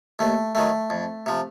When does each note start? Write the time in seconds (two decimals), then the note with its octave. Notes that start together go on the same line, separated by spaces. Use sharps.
0.19 D#2 A3
0.55 D#3 F#3 A3
0.90 F2
1.26 C3 F3